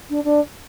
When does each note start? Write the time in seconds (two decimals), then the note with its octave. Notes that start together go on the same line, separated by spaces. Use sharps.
0.09 D4
0.23 D4